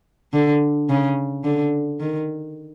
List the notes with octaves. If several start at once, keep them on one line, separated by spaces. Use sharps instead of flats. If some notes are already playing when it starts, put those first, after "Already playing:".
D3
C#3
D3
D#3